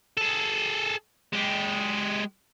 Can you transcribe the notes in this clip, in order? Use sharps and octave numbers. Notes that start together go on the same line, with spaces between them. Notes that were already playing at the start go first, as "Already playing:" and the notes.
G#4 A4
G#3 G4